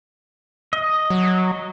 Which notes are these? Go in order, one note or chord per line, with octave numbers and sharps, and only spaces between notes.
D#5
F#3